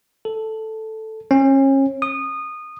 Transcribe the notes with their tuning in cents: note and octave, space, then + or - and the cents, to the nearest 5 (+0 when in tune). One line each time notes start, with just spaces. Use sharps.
A4 +0
C#4 -35
D#6 -20